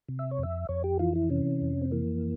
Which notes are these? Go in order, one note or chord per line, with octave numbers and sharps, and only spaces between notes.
C3
E5
C#5
F2 E5
F2 C#5
G4
E3 F4
E4
C3 C#4
F2
C4
E3 A#3